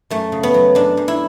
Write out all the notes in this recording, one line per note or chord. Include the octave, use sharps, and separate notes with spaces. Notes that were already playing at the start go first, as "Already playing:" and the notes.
F#2 A3
C#3
B3
F#3
F#2 D4
F#2
E4